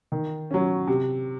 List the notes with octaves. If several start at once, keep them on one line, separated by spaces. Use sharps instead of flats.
D#3
F#3 C#4
C3